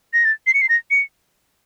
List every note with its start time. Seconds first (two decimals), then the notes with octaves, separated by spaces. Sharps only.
0.13 A#6
0.25 A6
0.47 C7
0.54 C#7
0.62 C7
0.69 A#6
0.91 C#7